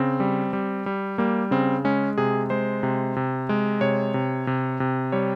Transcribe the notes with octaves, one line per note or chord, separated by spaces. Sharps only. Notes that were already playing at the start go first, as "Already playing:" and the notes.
Already playing: C#3 C4
G3
G3
G3
G3 A#3
C#3 C4
G#3 C#4
C3 G#4
G#3 C5
C3
C3
G#3
C3 C#5
C3
C3
C3
G3 C#5